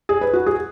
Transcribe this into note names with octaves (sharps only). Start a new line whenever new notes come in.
G#4
B4
F#4
G#4